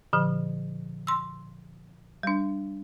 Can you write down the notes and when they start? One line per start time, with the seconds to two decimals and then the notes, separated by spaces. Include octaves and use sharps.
0.13 A#2 D3 F3
1.07 C6 E6
2.23 G3 D4